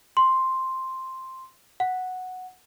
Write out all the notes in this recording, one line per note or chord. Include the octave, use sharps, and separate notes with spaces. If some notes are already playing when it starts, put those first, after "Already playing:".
C6
F#5